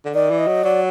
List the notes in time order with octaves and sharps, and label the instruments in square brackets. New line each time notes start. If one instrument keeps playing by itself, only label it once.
[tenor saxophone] D3
[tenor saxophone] D#3 [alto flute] D5
[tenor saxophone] E3
[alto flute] D#5
[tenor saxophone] F#3
[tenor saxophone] F#3 [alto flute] D5